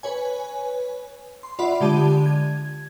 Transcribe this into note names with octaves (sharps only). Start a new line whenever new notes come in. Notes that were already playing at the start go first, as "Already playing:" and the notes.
B4 C#5 G#5
C6
F4 D5 E5 F#5 B5
D3 G#3 G4 D5 A5 D#7
G#6